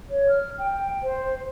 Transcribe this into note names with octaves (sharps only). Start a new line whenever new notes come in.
C#5
F6
G5
C5